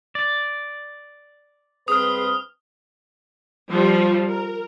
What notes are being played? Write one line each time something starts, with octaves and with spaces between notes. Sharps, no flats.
D5
G2 C4 G#4 B4 D#6 F6
F3 G3 C5
A#4